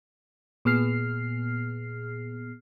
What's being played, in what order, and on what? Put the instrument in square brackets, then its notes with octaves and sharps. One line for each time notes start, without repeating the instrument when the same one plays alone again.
[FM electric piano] A#2 B3 G#4 F6 C7